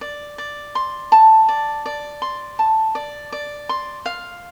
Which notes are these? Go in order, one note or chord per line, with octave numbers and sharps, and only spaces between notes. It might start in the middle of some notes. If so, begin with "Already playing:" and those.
D5
D5
C6
A5
D5
D5
C6
A5
D5
D5
C6
F5